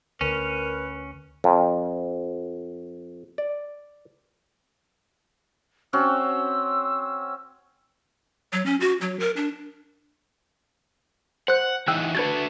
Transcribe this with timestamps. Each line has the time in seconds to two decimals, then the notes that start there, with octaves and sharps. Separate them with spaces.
0.21 D2 C#4 A#4 B4
1.44 F2
3.38 D5
5.93 C4 C#4 F#4 E6
8.53 F#3
8.66 C#4
8.80 F#4
9.01 F#3
9.20 A#4
9.36 D4
11.48 C5 F#5 F#6
11.88 E3 D#4 F#5 G5 E6 F#6
12.15 A3 D4 F#4 B4 G#6 A6